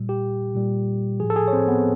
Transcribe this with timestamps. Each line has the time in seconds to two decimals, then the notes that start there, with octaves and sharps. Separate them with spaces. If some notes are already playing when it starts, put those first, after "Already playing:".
Already playing: A#2 G3
0.09 G4
0.55 A#2 G3
1.20 A2 F3 G#4
1.30 A4
1.36 G#4
1.48 C#5
1.53 C4 C5
1.68 B3 B4